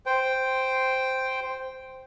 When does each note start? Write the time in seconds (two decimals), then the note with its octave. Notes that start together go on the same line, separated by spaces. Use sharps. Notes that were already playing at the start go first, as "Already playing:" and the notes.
0.06 C5 G5